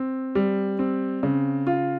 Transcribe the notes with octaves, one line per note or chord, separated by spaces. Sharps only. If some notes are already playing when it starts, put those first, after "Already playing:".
Already playing: C4
G3
C4
C#3
F4